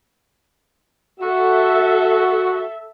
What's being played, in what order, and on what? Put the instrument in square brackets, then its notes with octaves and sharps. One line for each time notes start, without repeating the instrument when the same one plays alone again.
[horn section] F#4 [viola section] A4 E5